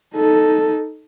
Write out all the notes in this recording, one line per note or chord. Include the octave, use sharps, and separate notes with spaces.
D#4 A4